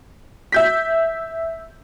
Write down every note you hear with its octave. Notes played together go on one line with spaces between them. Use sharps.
E5 G6 B6